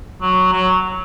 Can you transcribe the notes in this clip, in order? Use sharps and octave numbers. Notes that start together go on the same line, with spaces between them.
F#3
F#3